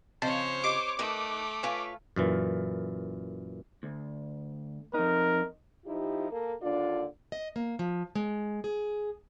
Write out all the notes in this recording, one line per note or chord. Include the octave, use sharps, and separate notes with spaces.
C#3 F3 C4 C5 C#5 D#5
G4 D#5 D6
A3 D#4 A#4 B4
F4 B4 C#5 G#5
F#2 A#2 E3
D2
F2 D#4 A#4
F3 D#4 E4 G4
A#3 A4
D#2 D3 D4 F4 D5
D#5
A#3
F3
G#3
G#4